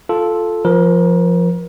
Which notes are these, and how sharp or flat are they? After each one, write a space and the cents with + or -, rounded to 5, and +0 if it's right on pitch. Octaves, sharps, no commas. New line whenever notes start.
F4 +0 A4 -5
F3 +0 A#4 +30